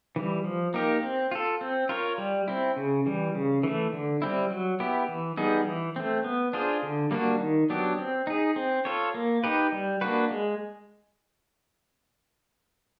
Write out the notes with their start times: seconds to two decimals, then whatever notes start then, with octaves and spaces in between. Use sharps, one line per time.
0.16 E3 G3
0.44 F3
0.74 A#3 D#4 G4 A#4
1.03 C4
1.31 F4 A4
1.61 C4
1.89 F4 A#4 C#5
2.18 G3
2.48 C4 E4
2.77 C#3
3.06 E3 G3
3.35 C#3
3.63 E3 A3
3.93 D3
4.22 G3 C4 E4
4.51 F#3
4.80 B3 E4 G4
5.08 E3
5.37 G3 B3 D#4 G#4
5.66 E3
5.96 A3 C4
6.24 B3
6.53 D4 F4 G#4 C5
6.83 D3
7.11 G3 A#3 D4 F#4
7.40 D#3
7.70 F#3 B3 D4 G4
7.98 C4
8.27 D#4 G#4
8.56 C4
8.85 F4 A4 C#5
9.14 A#3
9.44 D#4 G4 B4
9.72 G3
10.01 A#3 D4 F#4 B4
10.31 G#3